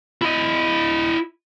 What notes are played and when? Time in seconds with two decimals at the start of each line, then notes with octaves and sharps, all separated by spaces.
0.22 E4 D#5